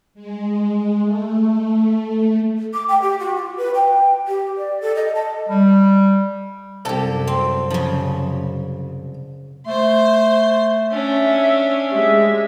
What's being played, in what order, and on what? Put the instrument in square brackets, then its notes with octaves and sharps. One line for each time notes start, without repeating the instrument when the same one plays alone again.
[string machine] G#3
A3
[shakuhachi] D6
G5
G4
F#4
F4
B4
G5
G4
D5
A4
D#5
A5
[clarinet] G3
[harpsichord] C2 [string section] F#2 [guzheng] G4 A4
[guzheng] C4
C#3 F3
[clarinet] A3 [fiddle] C5 C6
[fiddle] C#4 D4 [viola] E5
[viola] G#3 E5 [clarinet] G4